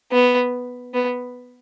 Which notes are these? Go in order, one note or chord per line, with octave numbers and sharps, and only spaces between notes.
B3
B3